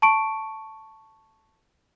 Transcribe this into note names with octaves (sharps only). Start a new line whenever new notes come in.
A5 C#6 D7